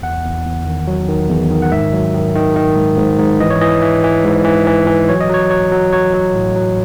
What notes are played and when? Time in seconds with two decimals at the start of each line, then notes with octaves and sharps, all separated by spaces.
0.03 E2 F#5
0.24 E2
0.46 E2
0.66 D#3
0.87 F#3
1.08 D#3
1.29 E2
1.50 D#3
1.62 F#5
1.72 G#2 E5
1.93 F#3
2.14 D#3
2.35 D#3
2.56 D#3
2.76 G#2
2.98 G#2
3.19 G#2
3.40 E3 D#5
3.50 C#5
3.61 E3 D#5
3.82 E3
4.04 E3
4.24 G#2
4.45 E3
4.67 E3
4.87 E3
5.09 F#3 C#5
5.21 D#5
5.30 F#3 C#5
5.50 F#3 C#5
5.72 F#3
5.93 F#3 C#5
6.14 F#3
6.35 A2
6.56 F#3